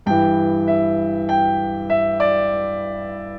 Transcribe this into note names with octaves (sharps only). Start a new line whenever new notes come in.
G2 E3 G5
E5
G5
E5
D5